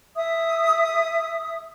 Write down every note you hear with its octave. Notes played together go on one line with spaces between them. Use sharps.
E5 D#6